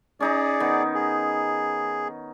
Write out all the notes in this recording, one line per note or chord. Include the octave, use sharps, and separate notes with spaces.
C#4 D#4 G#4 D5 A#5
D#3 B3
G#4